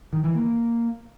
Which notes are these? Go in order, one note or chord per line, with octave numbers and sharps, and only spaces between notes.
D#3
E3
A#3